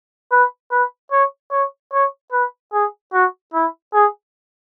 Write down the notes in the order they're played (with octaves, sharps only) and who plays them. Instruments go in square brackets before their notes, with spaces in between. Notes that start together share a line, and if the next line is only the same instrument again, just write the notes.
[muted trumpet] B4
B4
C#5
C#5
C#5
B4
G#4
F#4
E4
G#4